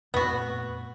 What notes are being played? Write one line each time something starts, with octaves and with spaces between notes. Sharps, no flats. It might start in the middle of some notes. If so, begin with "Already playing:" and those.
F2 A#2 A3 B3 F#4